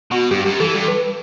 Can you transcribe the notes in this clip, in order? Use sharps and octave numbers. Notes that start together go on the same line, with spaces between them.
B2 F#4
G2 G4
F#2
E3 A4
G2
B4